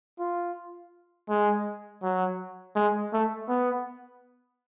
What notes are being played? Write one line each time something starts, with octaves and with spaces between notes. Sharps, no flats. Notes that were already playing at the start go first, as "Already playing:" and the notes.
F4
G#3
F#3
G#3
A3
B3